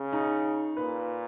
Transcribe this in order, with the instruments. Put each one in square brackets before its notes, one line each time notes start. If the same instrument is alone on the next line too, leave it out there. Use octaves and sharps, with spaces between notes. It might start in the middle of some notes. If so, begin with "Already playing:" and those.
Already playing: [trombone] C#3
[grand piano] D#4
[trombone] A#2 [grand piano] B4